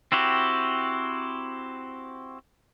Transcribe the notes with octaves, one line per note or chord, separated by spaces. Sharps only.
C4 E4 F#4 G4